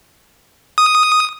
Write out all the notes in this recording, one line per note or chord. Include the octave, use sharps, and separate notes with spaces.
D#6